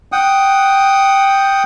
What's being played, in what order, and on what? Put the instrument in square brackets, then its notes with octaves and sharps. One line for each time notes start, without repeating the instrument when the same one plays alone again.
[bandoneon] F#5 G5 D#6